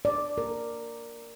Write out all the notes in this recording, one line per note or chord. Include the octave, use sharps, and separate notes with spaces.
D5
A#4